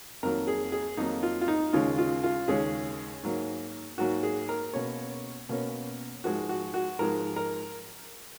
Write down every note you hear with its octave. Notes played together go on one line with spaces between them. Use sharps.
F2 D#3 F#3 A#3 A#4
G#4
G#4
F2 D#3 F#3 A#3 D#4
F4
F4
D#4
D#2 C#3 G#3 C#4 F4
F4
F4
D#2 C#3 G#3 C#4 G#4
G#2 F#3 A#3
G#2 F#3 A#3 F#4
G#4
A#4
B2 A#3 C#4 C#5
B2 A#3 C#4
G#2 F3 G#3 F#4
F#4
F#4
G#2 F3 G#3 A#4
A#4